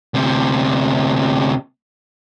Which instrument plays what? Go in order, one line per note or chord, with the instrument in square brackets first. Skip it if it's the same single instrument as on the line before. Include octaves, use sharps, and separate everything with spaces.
[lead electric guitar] D2 C3